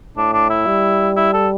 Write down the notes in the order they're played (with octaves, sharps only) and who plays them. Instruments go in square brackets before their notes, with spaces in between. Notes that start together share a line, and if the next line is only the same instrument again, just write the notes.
[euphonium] A2 [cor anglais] D4
[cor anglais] D4
E4
[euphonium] G3
[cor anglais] E4
A4